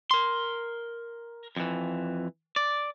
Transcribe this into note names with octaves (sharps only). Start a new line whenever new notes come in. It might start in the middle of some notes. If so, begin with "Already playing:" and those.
A#4 C6
F2 E3
D5